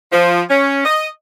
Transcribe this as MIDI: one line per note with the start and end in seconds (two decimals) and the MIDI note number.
0.12 0.42 53
0.49 0.80 61
0.85 1.07 75